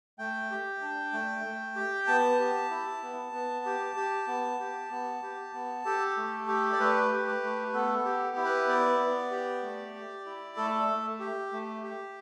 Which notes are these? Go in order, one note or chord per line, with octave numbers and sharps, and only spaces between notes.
A3 G5
G4
D4
A3
A3
G4
B3 A5
G4
E4
B3
B3
G4
G4
B3
G4
B3
G4
B3
G4 A4
A3
G4
D5
A3 B4
G4
B4
A3
B3 A4
A4
G4
E4
B4
B3 D5
B3
G4
A3
G4
E4
A3 A4
A3
G4
A3
G4